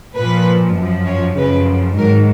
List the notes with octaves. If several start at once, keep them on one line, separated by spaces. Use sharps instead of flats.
A#2 F3 B4
F#2 F3
C#5
F#2 C#3 F3 B4
G#2 D#3 F#3 A#4